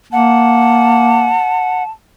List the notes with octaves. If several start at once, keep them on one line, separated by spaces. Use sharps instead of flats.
A#3 F#5 A5